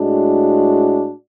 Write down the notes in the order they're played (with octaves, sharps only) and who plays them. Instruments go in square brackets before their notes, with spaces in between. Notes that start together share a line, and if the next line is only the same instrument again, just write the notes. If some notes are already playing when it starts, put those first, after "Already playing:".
Already playing: [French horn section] A2 G#3 D4 F#4